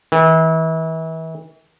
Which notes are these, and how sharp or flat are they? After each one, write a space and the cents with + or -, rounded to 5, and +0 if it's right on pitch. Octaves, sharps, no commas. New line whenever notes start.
E3 -35